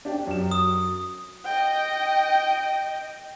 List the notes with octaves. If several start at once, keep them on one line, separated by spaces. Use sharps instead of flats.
D4 G4 D5
F#2 E7
D#6
D#5 G5